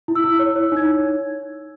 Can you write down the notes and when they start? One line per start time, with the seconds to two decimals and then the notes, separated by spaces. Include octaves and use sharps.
0.08 E4
0.15 E6
0.24 E4
0.39 C#5
0.56 C#5
0.72 D#4 G#6